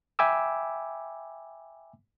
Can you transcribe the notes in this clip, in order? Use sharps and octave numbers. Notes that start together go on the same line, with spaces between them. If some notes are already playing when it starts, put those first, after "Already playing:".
E5 G5 G#5 B5 D6 E6